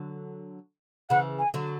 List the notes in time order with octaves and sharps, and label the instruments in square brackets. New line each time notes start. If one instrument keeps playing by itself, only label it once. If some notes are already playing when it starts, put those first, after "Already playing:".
Already playing: [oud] D3 F#3
[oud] C#3 E3 [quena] F#5
[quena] G#5
[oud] D3 F#3